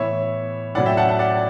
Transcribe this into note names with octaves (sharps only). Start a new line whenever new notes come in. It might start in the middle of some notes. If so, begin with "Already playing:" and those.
Already playing: A2 E3 B3 C#5 E5
A2 F#3 C#4 E4 D5 F#5
E5 G5
F#5 A5
F#5 A5
D5 F#5